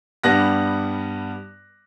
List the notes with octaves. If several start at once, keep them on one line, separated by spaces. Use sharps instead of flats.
G2 G3 B3 F#6 A#6